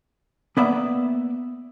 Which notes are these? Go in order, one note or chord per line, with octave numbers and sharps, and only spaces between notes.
A#3 B3 D5 E5